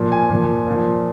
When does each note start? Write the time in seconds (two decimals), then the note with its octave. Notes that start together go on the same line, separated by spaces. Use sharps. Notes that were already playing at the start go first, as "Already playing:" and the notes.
Already playing: A#2 F3
0.12 G#5
0.30 A#2 F3
0.67 A#2 F3